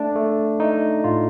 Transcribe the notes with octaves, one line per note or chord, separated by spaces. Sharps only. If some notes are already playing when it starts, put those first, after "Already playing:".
Already playing: A3 D4
A3
A3 D#4
A2 F4